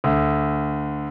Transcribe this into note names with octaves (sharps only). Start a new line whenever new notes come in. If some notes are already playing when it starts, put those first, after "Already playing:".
D2